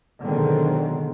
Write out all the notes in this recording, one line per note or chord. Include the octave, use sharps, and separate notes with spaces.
B2 D3 D#3 F#3 G#3 C4